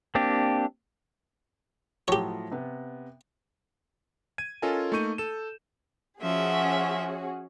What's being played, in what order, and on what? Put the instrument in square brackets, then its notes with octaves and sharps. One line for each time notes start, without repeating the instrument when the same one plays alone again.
[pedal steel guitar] A#3 C4 D4 G4
[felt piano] A2 F3 F#3 [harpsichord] G4 C#5
[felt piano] C3 B3
[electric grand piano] G#6 D#7
C#4 F4 A4 A#4 D#5 G#5
A3 A#3 D#4 C#6 G6 D#7
A4 E7
[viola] F3 E5 [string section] C#4 F#4 G#4